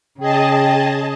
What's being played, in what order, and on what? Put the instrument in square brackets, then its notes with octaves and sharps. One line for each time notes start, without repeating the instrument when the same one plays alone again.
[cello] C#3 [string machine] G#4 D#5 A5 [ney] G5